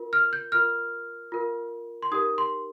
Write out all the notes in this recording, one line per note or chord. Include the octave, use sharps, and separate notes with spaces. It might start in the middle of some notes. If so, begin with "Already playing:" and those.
Already playing: F4 A#4
F6
G6
F4 A#4 F6
F4 A#4
C6
D#4 G4 A#4 D#6
C6